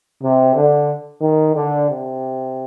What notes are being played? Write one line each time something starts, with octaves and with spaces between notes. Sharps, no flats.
C3
D3
D#3
D3
C3